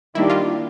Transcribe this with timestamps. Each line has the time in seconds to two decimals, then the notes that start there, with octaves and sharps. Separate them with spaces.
0.15 D#3 G3 A#3 D4 E4 G4
0.30 F4